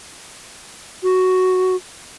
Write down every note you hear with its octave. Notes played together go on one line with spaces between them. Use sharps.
F#4